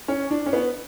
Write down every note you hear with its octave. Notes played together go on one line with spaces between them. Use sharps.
C#4
D4
C#4
B3